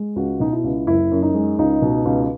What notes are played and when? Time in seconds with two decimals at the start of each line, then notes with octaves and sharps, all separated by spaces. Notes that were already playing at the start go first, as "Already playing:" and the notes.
Already playing: G#3
0.16 C#2 F#4
0.40 B2 D#4
0.52 E4
0.64 C#2
0.87 F#1 E4
1.11 F#2
1.23 D#4
1.34 G#3
1.59 C#2 D#4
1.82 B2
2.05 C#2